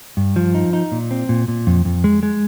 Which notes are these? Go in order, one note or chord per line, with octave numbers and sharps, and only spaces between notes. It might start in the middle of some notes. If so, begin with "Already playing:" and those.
G2
F3
D#4
D#4
A#2
C4
A#2
A#2
F2
F2
G#3
G#3